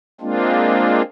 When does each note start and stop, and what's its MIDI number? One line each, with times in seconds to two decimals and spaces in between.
0.21 1.02 56
0.21 1.02 58
0.21 1.02 60
0.21 1.02 62
0.21 1.02 65